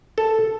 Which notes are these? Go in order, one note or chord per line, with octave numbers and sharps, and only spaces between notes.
A4